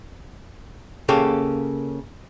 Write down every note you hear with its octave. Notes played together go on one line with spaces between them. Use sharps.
C#3 A#3 G4 A4